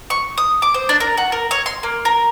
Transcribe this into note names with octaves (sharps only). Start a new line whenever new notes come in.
C#6
D#6
D6
C5
D4
A#4
F#4
A#4
C#5
C6
A#3
A#4